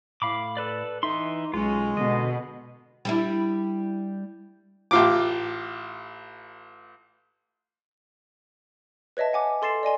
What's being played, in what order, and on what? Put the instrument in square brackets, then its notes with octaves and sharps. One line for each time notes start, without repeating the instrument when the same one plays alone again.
[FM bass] A2 [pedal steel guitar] F5 B5 D6
[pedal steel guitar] A4 B4 D5
[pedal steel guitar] E3 E5 C6 [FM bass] D#4
[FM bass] B1 [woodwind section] G#3 [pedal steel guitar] C#4 F4
[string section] B2 [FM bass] D3 [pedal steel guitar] D#5
[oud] G3 D4 E4
[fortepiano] A1 F4 D6
[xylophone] B4 C#5 D#5 E5 A5
F#5 G#5 D6
A4 C6 A6 C7 E7
D5 D#5 G#5 C6